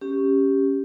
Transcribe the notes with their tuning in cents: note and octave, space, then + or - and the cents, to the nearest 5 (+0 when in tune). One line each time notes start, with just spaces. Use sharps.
C#4 +0 G4 +0